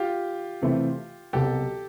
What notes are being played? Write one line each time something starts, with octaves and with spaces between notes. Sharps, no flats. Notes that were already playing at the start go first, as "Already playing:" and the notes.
Already playing: F4 G4
C3 E3 A3 C4 E4
C2 B2 F#3 G4 A4